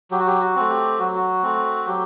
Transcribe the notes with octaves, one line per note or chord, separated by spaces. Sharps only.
F#3 G4
F#4
G4
F#4
A3 C4
G4
F#3 F#4
F#4
A3 C4
F#3 G4